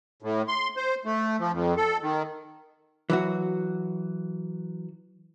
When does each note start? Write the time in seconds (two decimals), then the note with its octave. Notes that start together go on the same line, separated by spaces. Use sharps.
0.22 A2
0.48 C6
0.76 C5
1.05 A3
1.40 F3
1.52 F2
1.77 A4
2.02 D#3
3.10 E3 F#3 F#4